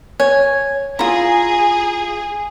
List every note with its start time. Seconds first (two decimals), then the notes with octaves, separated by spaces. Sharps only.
0.20 C#5 G#5
0.99 E4 F4 G#4 A#5